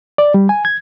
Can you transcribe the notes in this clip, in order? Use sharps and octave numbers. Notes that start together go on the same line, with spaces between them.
D5
G3
G#5
G#6